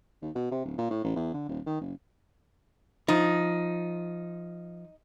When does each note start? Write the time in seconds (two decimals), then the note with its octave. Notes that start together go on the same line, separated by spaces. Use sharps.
0.22 D#2
0.35 B2
0.51 C3
0.65 D1
0.78 A#2
0.90 A2
1.04 A1
1.16 E2
1.34 D3
1.49 D#1
1.67 D#3
1.81 F#1
3.08 F3 D#4